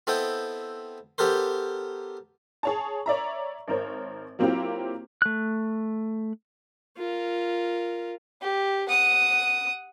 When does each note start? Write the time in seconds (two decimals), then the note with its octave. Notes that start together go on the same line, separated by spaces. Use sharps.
0.07 B3 C4 E4 A4 D#5 G5
1.18 B3 G4 A4 A#4 C5
2.63 G#4 C#5 A5
3.06 C#5 D5 E5 A#5
3.68 G#1 A#4 C5 C#5
4.39 F#3 A#3 C4 E4 F4 G4
5.22 A3 F#6
6.98 F4 A#4
8.42 G4
8.89 F#5 D#6